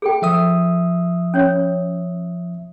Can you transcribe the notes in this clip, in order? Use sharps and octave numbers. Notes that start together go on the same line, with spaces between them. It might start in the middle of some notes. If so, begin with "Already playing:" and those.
G#4 A4 G5
F3 E5 D#6
C#4 C#5